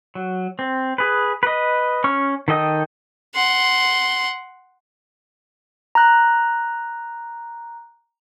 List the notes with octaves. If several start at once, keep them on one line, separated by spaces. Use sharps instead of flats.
F#3
C4
G#4 B4
B4 D#5
C#4 C#6 F6
D#3 A4 D#5 G5 D#6
F#5 C6
A#5 F#6